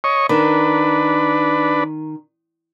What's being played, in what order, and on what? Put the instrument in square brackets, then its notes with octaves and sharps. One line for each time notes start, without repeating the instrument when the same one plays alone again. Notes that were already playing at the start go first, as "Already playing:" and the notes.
[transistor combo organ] C#5 D#5 C#6
[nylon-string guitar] D#3 [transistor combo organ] D4 B4